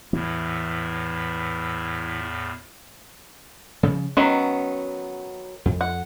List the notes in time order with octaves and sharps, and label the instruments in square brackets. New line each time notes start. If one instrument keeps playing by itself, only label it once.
[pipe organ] E2 A2 [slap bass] E3
[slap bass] C#3 F3
[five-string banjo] D#3 F#3 B3 [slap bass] C#4
[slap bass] F2
[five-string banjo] F#5